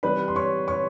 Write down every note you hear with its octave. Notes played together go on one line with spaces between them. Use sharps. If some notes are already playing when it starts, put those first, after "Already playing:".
C3 E3 G3 B4 B5
C6
C#5 C#6
C#5 C#6